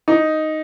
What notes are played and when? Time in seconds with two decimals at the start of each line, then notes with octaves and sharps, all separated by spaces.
0.08 D#4